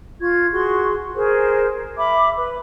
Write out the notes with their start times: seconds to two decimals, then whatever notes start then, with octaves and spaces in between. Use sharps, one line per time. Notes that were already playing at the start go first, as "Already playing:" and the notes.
0.21 F4 C#6 G#6
0.52 F#4 G#4 C6 C#6
1.15 G#4 A#4 C5
1.97 E5 B5 D6
2.36 B4